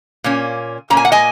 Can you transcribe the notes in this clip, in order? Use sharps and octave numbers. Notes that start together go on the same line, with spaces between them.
A#2 A#3 C#4
A#2 A#3 C#4 A#5
G#5
F#5
D#5 G#5